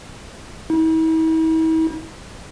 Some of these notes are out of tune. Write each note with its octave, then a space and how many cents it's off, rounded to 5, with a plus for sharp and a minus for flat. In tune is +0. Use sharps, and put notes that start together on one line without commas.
E4 -45